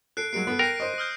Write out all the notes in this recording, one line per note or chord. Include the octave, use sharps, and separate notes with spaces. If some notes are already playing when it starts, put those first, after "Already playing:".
A4 F#6 C7 D7
F#3 G#3 A#3 C7 D7
B3 A4
A#4 G5 A#6 C7 D#7
C5 D#5
D#6 F6 G6